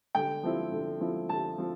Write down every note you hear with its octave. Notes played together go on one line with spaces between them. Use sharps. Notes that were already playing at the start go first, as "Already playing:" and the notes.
D3 G5
F3 C4 E4
D3
F3 C4 E4
D3 A5
F3 C4